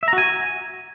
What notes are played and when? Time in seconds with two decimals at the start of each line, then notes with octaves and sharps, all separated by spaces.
0.03 E5
0.08 A#5
0.13 F#4
0.18 G#5